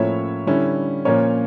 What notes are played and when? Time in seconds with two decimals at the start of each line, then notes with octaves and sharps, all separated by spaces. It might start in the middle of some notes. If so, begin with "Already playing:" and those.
Already playing: A2 F3 A#3 C#4 E4 C#5 E5
0.47 D3 G3 C#4 E4
1.05 A#2 F3 A#3 C#4 C#5